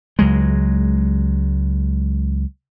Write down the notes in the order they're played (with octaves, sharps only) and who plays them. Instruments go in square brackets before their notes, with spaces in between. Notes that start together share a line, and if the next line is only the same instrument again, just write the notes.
[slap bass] C#2 F#3 G#3